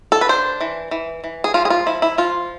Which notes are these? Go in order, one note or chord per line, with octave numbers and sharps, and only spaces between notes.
A4
B4
D4 C5
E3
E3
E3
G#4
F3 F4
G#4
F4
F3 E4
E4
F3 F4